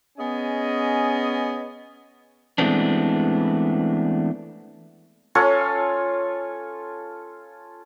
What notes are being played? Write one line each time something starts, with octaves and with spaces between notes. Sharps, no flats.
B3 C#4 G#4 D#5 G#5
E3 G#3 A3 B3 C4 D4
C#4 F4 A4 C#5